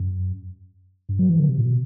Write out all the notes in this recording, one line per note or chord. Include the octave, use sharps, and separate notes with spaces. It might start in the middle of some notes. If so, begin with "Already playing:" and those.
Already playing: F#2
G2
F#3
E3
D3
C3
A2
B2